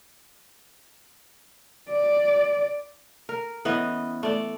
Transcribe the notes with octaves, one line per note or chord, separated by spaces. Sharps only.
D5
A#4
E3 B3 C#4 D#5
A3 D5